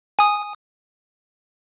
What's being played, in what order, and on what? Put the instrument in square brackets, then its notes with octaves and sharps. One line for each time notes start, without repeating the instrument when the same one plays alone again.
[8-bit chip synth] G#5 D#6